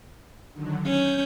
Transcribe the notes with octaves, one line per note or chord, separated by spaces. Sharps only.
D3 D#3 F#3
C#4 G6